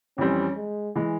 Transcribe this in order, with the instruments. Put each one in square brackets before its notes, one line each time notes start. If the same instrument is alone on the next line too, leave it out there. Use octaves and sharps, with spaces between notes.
[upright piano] F2 E3 G3 C4 [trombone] C#4
[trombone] G#3
[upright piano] E3 G#3